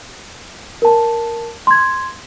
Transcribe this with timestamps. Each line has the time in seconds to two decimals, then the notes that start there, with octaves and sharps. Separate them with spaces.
0.82 A#4 A5
1.67 C6 G#6